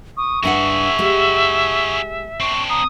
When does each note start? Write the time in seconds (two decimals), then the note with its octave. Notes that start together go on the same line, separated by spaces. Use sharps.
0.17 C#6 D#6
0.43 G2 D4 F#4 G#4 E5 F#5
0.99 G#3 G4
2.40 C4 D4 C#6
2.69 A#5 D#6